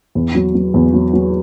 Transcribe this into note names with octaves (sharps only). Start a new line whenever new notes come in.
E2
F#3
F#3
E2
F#3
F#3